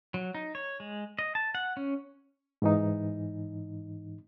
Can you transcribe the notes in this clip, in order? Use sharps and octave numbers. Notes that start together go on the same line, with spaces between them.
F#3
D#4
C#5
G#3
D#5
A5
F#5
C#4
G#2 E3 D#4